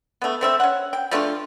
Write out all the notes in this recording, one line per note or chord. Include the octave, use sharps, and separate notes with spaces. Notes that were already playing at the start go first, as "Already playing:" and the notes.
A3 B3
A3 C4 E5
C#4 F#5
G5
F3 A3 D4 F4